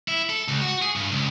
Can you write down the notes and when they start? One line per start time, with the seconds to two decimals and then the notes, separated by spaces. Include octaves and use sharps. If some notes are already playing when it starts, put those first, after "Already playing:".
0.08 E4
0.30 A4
0.48 C#2
0.62 F#4
0.82 G#4
0.96 G2
1.12 C#2